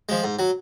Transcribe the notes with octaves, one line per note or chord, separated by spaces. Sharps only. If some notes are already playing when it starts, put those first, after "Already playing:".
F3 G#3
G#2
F#3